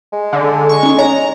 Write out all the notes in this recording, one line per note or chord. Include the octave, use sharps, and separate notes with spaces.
G#3
D3
C#6
C#4 D#4
C#5 A#5